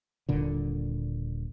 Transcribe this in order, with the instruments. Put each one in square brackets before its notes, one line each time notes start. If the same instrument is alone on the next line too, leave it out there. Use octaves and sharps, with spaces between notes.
[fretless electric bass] D#1 A#2 D3